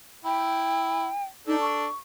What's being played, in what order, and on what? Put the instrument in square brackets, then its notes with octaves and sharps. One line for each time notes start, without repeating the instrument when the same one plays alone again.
[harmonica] E4 [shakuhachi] G5
[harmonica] D4 A4 [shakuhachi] D#4
[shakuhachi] C#6